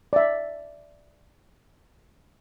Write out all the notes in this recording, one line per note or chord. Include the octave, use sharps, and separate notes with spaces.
D5 E5